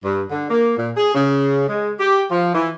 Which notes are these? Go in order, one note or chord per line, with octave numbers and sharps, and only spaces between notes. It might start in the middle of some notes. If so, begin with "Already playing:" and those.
G2
D3
A#3
A#2
G#4
C#3
G#3
G4
F3
E3